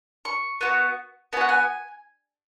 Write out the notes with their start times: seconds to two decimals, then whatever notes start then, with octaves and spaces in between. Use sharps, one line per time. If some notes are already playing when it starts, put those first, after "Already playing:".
0.25 C#6
0.61 B3 F#4
1.33 B3 G#5
1.37 F#4 F#5
1.49 G#5